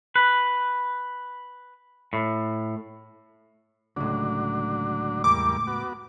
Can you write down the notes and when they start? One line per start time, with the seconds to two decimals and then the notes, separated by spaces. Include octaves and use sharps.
0.16 B4
2.13 A2
3.96 C#2 A2 D3 F#3 D4
5.24 E2 G3 A#3 D6
5.67 B3 F#4